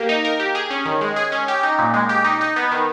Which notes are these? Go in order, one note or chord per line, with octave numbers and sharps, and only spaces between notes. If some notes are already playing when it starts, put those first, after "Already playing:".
Already playing: A#3 G4 A#4
D#4
A#4
G4
G#4
C#4
D#3
G#3
G#4
C#4
G4
D#4
A#2
G#3
G4
D#4
D#4
B3
D#3